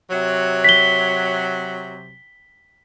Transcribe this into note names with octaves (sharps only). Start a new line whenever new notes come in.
C3 F#3
B6 G7